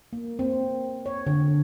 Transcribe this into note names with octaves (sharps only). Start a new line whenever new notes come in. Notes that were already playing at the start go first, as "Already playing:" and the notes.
A#3
C4
C#5
D3